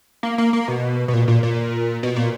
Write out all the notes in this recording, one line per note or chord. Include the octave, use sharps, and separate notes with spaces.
A#3
A#3
A#3
B2
B2
A#2
A#2
A#2
B2
A#2